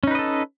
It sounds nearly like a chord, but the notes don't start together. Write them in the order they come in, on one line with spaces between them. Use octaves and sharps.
C#4 D#4 B4 D#5 A4